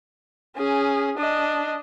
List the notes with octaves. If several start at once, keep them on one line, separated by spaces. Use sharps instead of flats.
C#4 G#4
D4 D#5